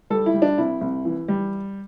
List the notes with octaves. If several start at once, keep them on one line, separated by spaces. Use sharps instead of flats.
G3 A4
E4
G3
D4
C2 E4
C2
E3
G3